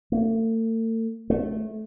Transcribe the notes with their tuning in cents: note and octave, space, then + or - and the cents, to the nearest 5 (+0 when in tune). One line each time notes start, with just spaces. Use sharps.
A3 +40
A3 -15